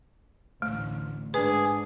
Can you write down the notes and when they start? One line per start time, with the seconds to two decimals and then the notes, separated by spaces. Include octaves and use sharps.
0.62 A1 D2 A3
1.34 G#2 D4 G#4 B4